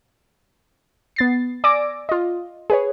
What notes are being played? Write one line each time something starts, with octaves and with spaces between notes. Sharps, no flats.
B3 A6 C7
D5 G#5 D6 E6 A#6 D7
F4 D#5
G#4 B4 C#5